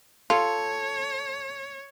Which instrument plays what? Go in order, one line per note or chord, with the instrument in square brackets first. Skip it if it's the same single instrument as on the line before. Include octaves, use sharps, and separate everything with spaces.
[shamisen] F4 [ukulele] A4 [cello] C#5